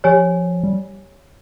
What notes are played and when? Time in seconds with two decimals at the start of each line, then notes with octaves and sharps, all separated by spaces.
0.04 F3 G4 C#5 G#5
0.64 G3